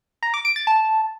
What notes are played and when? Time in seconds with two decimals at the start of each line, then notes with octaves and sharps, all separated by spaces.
0.23 A#5
0.34 D6
0.45 D7
0.56 A6
0.67 A5